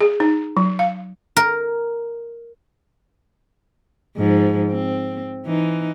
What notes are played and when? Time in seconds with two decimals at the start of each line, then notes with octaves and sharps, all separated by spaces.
0.01 G#4
0.20 D#4
0.57 F#3
0.79 F5
1.37 A#4
4.16 G#2 F3
4.71 C4
5.46 E3 D#4